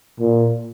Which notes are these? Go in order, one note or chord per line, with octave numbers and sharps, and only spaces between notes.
A#2